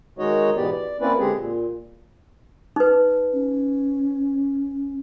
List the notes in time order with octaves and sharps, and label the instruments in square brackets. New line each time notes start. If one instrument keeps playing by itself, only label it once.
[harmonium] D#3 G#3 D#4 F#4 C#5 D#5
G#2 B2 E3 B3 G4 D5
D5
A#3 C4 C#4 E4 B4 D5
D3 G#3 C4 G4 G#4
A#2
[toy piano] D#4 B4
[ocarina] C#4